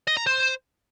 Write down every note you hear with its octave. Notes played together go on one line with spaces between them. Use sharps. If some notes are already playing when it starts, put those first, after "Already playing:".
D#5
A#5
C5